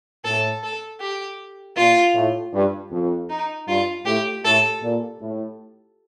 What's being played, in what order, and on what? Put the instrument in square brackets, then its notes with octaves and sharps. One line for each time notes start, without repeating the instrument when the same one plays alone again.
[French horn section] A2 [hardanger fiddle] A4
[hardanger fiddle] A4
G4
[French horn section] A#2 [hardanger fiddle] F4
[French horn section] A2
G2
F2
[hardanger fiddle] D#4
[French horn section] G2 [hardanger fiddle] F4
[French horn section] A2 [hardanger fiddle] G4
[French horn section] A2 [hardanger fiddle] A4
[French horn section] A#2
A2